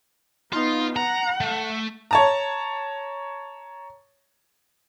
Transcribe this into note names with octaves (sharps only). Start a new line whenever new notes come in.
B3 D#4 F4
F#5 A#5
A3
C#5 A5 A#5